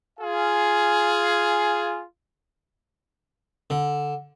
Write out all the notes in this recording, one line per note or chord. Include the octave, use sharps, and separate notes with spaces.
F4 G#4 F5 G#5
D3